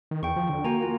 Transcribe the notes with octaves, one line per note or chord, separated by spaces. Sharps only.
D#3
E2 G5 C#6
F3
D3
A#3 F#4 G#5 A#5
F4